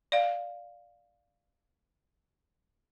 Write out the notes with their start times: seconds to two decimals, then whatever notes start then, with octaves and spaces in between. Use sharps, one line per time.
0.12 D5 F5